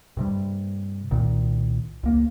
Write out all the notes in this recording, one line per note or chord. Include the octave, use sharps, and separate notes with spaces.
G2 C3 G3
C2 A#2 D#3
C#2 A#3